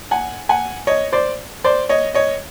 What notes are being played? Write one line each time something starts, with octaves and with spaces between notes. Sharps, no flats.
F#5 G#5
F#5 G#5
C#5 D#5
C5 D5
C5 D5
C#5 D#5
C#5 D#5